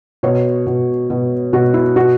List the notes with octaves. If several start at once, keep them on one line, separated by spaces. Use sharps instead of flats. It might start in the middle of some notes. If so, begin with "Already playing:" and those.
B2 C#5
B2
B2
B2 F#4
E4
B2 F#4